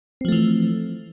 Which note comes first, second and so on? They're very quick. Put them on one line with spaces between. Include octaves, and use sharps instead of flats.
C4 F3 A3 E3